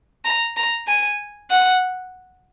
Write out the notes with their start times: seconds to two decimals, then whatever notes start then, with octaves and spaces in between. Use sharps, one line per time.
0.25 A#5
0.57 A#5
0.88 G#5
1.50 F#5